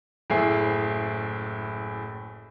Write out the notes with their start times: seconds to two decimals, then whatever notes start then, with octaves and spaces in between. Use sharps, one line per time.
0.30 F#1 A2 E4 G#4 C7